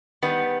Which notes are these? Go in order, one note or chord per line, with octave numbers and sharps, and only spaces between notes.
D#3 G3 B3